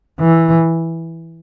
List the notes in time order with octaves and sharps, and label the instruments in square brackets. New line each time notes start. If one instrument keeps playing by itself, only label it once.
[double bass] E3